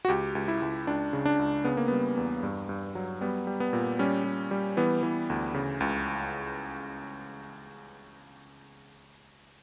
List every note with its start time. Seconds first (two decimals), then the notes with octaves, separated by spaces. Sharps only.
0.05 F#4
0.08 C#2 G4
0.35 C#2
0.48 E4
0.62 C#2
0.87 C#2 D4
1.13 C#3
1.25 D4
1.39 C#2
1.64 C#3 B3
1.77 A#3
1.88 G3 B3
2.17 E2
2.43 G2
2.69 G2
2.95 F#3
3.21 G3 B3
3.47 G3
3.60 B3
3.73 A#2
3.99 G3 C#4
4.24 G3
4.51 G3
4.77 E3 B3
5.03 E3
5.30 D2
5.54 C#3
5.80 C#2